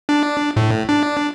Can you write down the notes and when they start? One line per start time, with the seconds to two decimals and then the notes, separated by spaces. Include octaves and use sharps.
0.09 D4
0.56 A2
0.89 D4